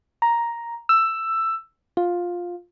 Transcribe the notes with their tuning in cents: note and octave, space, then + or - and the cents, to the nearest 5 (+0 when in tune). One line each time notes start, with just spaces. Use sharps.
A#5 +5
E6 +10
F4 +10